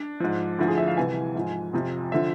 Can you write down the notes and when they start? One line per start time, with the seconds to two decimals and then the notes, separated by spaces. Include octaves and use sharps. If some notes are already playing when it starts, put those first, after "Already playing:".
Already playing: D4
0.20 G#2 F3
0.59 D2 D3 F3 E4
0.68 G#4
0.78 E5
0.88 F5
0.97 C2 C3 E3 G#5
1.35 G#2 F3
1.73 F2 C3 F3
2.12 D3 F3 E5